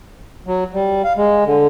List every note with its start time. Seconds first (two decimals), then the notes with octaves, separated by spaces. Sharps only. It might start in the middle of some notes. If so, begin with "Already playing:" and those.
0.46 F#3
0.73 G3
1.04 F5
1.17 G#3
1.45 D3